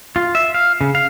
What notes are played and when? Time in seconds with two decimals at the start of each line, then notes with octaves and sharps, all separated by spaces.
0.16 F4
0.35 E5
0.54 F5
0.81 C#3
0.95 F5